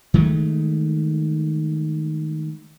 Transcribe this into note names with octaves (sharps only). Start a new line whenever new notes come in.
D#3 G#3 A3